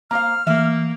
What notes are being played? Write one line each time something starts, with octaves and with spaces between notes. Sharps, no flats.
A#3 C5 F5 A#5 F6
E3 A#3 E5